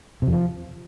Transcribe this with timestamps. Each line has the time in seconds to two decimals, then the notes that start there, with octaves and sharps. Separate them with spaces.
0.22 C3
0.27 F2
0.33 F3